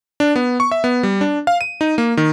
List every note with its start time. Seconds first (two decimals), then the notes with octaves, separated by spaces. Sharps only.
0.20 D4
0.36 B3
0.60 C#6
0.71 E5
0.84 B3
1.03 G3
1.21 D4
1.47 F5
1.61 D#7
1.81 D#4
1.98 A#3
2.17 D#3